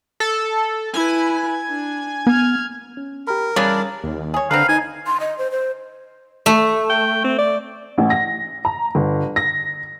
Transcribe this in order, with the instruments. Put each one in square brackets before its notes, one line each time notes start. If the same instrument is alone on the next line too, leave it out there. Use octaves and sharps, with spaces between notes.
[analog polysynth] A4
[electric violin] E4 B4 [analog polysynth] G#5
[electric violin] D4
[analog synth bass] B3 [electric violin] F6 G#6
[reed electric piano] C#4
[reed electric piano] G4 B5 [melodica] A#4
[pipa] C#3 [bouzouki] E3 D4 D5 [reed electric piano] G3
[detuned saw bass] D#2
[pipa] G#4 C#5
[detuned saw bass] D3 [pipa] C4 A#4 B4 [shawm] F5
[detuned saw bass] D#4 [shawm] G#5
[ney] C6
D#5
C5
C5
[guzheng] A3
[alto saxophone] G5
C4
D5
[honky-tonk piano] A1
A#6
A#5
G1
A#6